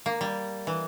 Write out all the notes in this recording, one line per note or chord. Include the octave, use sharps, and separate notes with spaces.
A#3
G3
E3